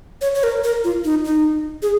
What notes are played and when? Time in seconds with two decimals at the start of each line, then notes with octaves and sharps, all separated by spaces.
0.22 C#5
0.35 C#5
0.43 A#4
0.64 A#4
0.84 F4
1.05 D#4
1.25 D#4
1.82 G#4